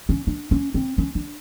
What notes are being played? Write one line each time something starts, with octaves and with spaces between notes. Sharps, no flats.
C#4
D4
C#4
C4
C#4
D4